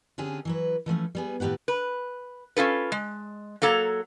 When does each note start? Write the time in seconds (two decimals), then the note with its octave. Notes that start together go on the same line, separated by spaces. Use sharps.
0.18 D3 C4 C#4 G4 G#4
0.45 E3 F#3 B4
0.86 E3 F3 A3 C#4
1.15 G3 B3 G#4
1.40 A2 D#3 G4 B4 F#5
1.68 B4
2.57 C#4 F4 A4 B4
2.92 G#3
3.62 F#3 A#3 A4 A#5